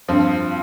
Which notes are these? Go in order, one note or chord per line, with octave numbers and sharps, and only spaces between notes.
G2 F3 C4 F4